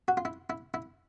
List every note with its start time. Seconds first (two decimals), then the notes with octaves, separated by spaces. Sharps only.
0.08 F#4
0.17 F4
0.25 E4
0.50 E4
0.74 E4